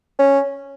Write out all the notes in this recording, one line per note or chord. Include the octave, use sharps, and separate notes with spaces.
C#4